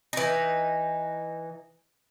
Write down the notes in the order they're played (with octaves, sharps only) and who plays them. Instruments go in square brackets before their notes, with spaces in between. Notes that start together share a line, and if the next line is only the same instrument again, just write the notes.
[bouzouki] E3 D#4